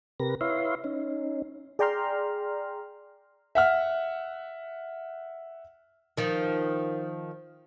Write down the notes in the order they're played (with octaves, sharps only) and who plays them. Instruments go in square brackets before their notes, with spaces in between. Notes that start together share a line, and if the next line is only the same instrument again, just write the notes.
[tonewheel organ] C3 G4 A#4 B4 A#6
E4 B4 C#5 E5 F5 C6
C#4 D#4
[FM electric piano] G#4 D5 G5 A#5 C6 F6
[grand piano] E5 F#5 F6
[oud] D#3 F3